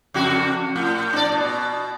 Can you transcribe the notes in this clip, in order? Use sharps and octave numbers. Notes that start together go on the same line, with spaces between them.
F2 C#3 F#4
A2
D4 D5
B2